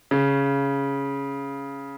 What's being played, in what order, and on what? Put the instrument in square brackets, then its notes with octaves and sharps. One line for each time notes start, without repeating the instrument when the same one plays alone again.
[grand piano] C#3